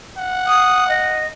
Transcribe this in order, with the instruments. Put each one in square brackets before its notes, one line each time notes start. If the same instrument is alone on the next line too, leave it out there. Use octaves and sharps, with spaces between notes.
[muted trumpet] F#5
[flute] D#6
D#5